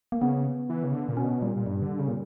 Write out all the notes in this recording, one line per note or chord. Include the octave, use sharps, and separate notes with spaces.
A#3
C#3 B3
E3
C#3
D3
A#2
B2 C#4
A#2 G3
A#2
G2 G3
D3
C#3
A#2